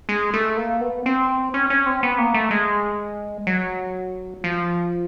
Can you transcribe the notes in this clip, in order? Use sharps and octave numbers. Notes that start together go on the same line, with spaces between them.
G#3
A3
A#3
B3
C4
C#4
C#4
C4
B3
A#3
A3
G#3
F#3
F3